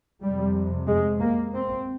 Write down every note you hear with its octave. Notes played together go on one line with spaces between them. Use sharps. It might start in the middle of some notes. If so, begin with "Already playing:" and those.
F2 C3 G3
G#3
A#3
C4